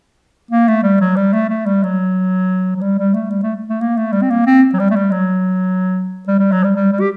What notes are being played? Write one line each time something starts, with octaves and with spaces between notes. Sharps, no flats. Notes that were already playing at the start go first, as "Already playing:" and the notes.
A#3
A3
G3
F#3
G3
A3
A3
G3
F#3
F#3
G3
G3
A3
G3
A3
A3
A#3
A3
G3
C4
A#3
C4
F#3
G3
A3
G3
F#3
G3
G3
F#3
G3
G3
G3
G4